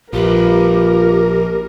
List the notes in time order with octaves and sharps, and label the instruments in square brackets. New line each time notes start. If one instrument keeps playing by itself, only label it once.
[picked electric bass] A#1 [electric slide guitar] F4 B4 [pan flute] G4 [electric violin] A#4